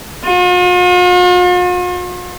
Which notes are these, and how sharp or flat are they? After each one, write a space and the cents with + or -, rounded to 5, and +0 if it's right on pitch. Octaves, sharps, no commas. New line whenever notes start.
F4 +45